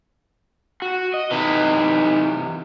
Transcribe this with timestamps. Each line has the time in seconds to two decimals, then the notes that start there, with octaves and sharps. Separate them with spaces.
0.82 F#4
1.14 D#5
1.31 C3 E3 D#4 B4